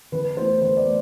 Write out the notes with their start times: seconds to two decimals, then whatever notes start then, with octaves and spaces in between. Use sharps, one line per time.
0.12 E3 B4
0.37 A3 E4 C5
0.61 E3 C5
0.77 D5
0.85 A3